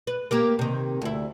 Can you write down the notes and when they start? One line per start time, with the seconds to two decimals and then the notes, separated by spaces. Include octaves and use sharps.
0.07 B4
0.31 A#3 G4 A#4
0.59 C3 D#3
1.02 D2 E4